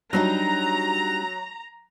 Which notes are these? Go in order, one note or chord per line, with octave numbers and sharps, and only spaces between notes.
F#3 G3 D4 D#4 A#5